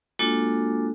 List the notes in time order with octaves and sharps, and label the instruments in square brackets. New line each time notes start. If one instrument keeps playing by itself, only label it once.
[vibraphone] G#3 A#3 D4 F4 F#4 A4